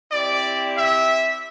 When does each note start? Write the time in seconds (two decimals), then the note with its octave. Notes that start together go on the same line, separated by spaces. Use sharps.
0.11 C4 E4 G4 D5
0.75 E5